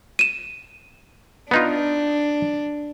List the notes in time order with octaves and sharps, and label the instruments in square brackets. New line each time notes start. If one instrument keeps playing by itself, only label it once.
[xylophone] D#7 E7
[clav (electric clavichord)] B3 D#4 F4 [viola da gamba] D4